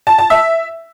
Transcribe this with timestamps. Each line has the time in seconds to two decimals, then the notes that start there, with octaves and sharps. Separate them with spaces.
0.07 A5
0.18 A5
0.30 E5